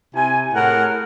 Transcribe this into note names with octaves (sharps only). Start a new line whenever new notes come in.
C3 E4 G#5
A2 G#4 A#4 F#5